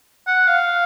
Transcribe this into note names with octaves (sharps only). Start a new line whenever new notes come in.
F#5
F5